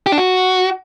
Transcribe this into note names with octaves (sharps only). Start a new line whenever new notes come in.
G4
D4
F#4